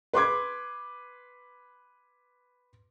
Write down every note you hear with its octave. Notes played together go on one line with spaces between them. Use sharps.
B4 C6 D6 G#6